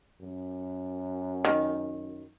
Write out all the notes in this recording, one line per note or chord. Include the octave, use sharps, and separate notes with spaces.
F#2
D#3